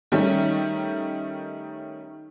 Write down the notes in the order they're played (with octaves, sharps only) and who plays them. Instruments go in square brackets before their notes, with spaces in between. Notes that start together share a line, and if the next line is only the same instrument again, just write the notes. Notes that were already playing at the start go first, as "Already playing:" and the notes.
[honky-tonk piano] D#3 G3 A3 C#4